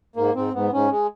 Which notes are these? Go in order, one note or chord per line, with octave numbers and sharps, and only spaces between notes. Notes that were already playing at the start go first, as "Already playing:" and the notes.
G#2 A#3
G#2 C4
G#2 B3
G#2 C#4
G#3